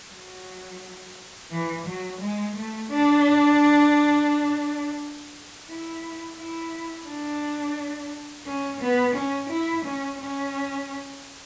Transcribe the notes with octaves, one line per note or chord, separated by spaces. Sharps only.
F#3
E3
F#3
G#3
A3
D4
E4
E4
D4
C#4
B3
C#4
E4
C#4
C#4